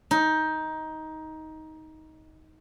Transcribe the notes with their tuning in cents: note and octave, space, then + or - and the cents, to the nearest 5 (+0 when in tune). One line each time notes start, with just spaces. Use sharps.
D#4 +15